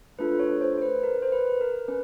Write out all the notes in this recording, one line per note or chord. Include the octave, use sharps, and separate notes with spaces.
A3 D4 F4 A4 B4
C#5
C5
C5
B4
A#4
C5
B4
A#4
C#4 B4